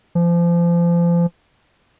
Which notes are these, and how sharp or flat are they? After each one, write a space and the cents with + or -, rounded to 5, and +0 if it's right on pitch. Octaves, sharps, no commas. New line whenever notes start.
F3 -30